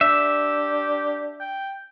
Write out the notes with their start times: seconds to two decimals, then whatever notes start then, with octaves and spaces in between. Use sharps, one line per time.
0.01 D4 G4 E5
1.40 G5